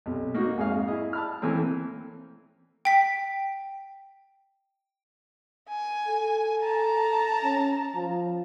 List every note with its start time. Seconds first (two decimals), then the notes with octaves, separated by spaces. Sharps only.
0.06 B1 C3
0.34 A#3 D#4 F#4
0.57 F2 G#2 G#4 C#5 F5
0.88 E4 G#4 D#5
1.13 A5 B5 F6
1.42 E3 A3 A#3 C4 C#4
2.85 G5 B6
5.69 G#5
6.08 A4
6.61 A5 A#5
7.43 C#4
7.95 F3